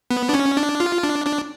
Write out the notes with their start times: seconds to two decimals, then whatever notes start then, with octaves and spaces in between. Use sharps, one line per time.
0.11 B3
0.29 D4
0.34 C#4
0.57 D4
0.80 F4
1.03 D4
1.26 D4